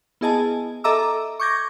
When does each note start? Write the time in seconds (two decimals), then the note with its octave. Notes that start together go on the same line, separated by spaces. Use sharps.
0.21 B3 E4 G#4 D#5 G#5 A5
0.84 A4 D#5 E5 A#5 D6 E6
1.40 C#6 D6 G6 G#6 A#6